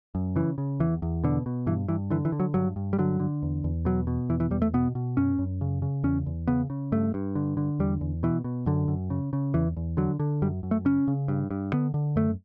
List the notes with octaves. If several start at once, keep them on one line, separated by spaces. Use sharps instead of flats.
F#2
C#3 E3
C#3
E2 E3
E2
B2 D3
B2
G2 E3
G2 E3
D3 E3
E3
D3
F#3
G2 F#3
G2
G3
D3 F#3
D3
E2
E2
B2 F#3
B2
E2 E3
E3
E2 G3
A3
B2 B3
B2
F#2 C#4
F#2
C#3
C#3
E2 C#4
E2
C#3 B3
C#3
G2 A3
G2
D3
D3
E2 G3
E2
B2 E3
B2
F#2 D3
F#2
C#3
C#3
E2 E3
E2
D3 F#3
D3
F#2 G3
F#2
A3
C#3 C#4
C#3
G2
G2
D3 B3
D3
F#2 A3